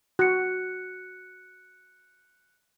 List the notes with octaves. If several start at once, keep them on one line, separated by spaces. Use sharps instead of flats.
F#4 F#6 C#7